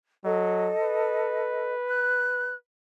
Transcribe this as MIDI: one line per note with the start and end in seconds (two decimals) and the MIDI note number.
0.24 0.73 54
0.24 1.73 69
0.24 1.73 75
0.82 2.56 71
1.88 2.55 90